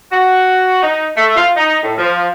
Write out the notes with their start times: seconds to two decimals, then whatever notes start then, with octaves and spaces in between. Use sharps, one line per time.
0.13 F#4
0.83 D#4
1.17 A3
1.37 F4
1.57 D#4
1.83 A2
1.98 F3